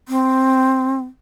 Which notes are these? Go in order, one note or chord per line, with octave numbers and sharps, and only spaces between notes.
C4